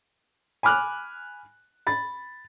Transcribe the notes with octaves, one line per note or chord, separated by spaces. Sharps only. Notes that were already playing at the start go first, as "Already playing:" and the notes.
G#5 B5 D6 F6 F#6
B5 A6